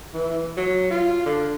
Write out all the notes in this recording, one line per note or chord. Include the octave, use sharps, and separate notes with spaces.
E3
F#3
F4
D3